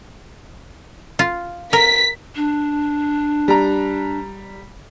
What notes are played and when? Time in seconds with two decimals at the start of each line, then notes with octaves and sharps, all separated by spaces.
1.19 F4
1.73 A#4 B6
2.36 D4
3.48 G3 A#5